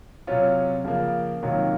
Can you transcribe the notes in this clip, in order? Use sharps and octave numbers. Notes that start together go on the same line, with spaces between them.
C3 F#3 C#4 F4
C#3 F3 A#3
C3 D#3 F#3 A#3 F4